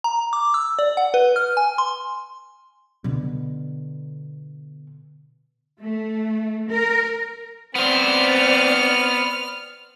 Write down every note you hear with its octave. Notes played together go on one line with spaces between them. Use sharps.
A#5
D6
E6
D5
F#5
B4
F6
G#5
C6
B2 D3
A3
A#4
B3 C4 C5 D5 F6